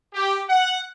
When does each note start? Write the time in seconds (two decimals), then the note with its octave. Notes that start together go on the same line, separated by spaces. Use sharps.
0.14 G4
0.48 F#5